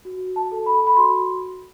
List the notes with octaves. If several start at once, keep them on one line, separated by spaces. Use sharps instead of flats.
F#4
A5
A4
B5
B5
F#4 C6